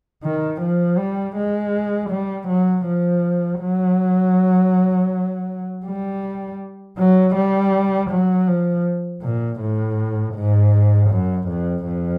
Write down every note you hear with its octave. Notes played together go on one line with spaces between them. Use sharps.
D#3
F3
G3
G#3
G3
F#3
F3
F#3
G3
F#3
G3
F#3
F3
A#2
A2
G#2
F#2
F2
F2